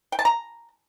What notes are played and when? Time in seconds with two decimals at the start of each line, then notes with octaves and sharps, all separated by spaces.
0.12 G5
0.19 A5
0.25 A#5